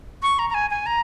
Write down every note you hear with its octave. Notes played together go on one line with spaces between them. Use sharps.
C#6
A#5
A#5
G#5
G#5
A#5